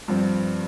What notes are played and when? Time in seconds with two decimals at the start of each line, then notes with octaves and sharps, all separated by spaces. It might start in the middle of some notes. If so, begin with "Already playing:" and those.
0.08 G2 F3 C4